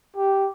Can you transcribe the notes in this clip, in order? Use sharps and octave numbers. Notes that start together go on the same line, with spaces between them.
G4